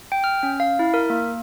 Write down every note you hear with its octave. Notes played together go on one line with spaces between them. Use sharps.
G5
F6
C#4
F5
E4
A#4
A#3